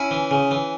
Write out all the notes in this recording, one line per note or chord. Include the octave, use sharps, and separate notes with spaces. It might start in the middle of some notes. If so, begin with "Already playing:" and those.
Already playing: C#4 E4
E3
C#3
E3